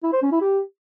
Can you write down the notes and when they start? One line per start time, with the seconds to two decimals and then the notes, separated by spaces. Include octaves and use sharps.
0.03 E4
0.13 C5
0.22 C#4
0.32 E4
0.41 G4